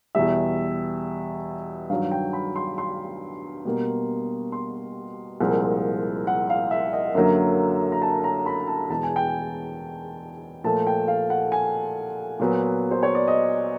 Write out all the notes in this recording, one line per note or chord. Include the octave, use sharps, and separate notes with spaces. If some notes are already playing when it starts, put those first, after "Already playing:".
E2 B2 G3 E5
G2 D#3 F#3 F5
G5
B5
C6
C6
B2 G3 A#3
C6
C2 A#2 F3 G#3
F#5
F5
E5
D#5
F#2 D3 F#3 A#3 E5
A#5
A5
A#5
B5
A5
E2 B2 G#3 B3 A5
G#5
G5
G#5
A#2 F3 A3 A5
G5
F5
F#5
G#5
A#2 F#3 B3
C5
C#5
D5
D#5